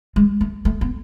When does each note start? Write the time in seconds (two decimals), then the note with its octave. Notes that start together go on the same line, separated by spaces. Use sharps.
0.16 G#3
0.41 A3
0.65 A3
0.81 B3